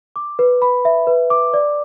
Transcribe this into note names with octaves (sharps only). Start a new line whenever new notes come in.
D6
B4
B5
E5
B4
D6
D5